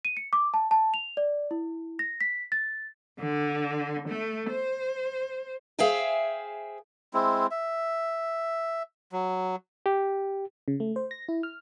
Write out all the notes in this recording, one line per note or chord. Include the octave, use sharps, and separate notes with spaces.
D#7
C#7
D6
A5
A5
F7
D5
E4
A#6
B6
A6
D3
A3
C5
G#4 C5 E5 F5 G5 G#5
G#3 C4 E4
E5
F#3
G4
C#3
A3
C5
A#6
E4
F6